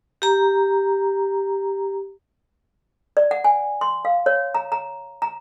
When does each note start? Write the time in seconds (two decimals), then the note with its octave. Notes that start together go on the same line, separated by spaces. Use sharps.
0.22 G4 A#5
3.17 D5
3.31 F#5
3.44 G#5
3.81 C6
4.05 F5
4.26 C#5
4.55 A#5
4.72 A#5
5.22 A#5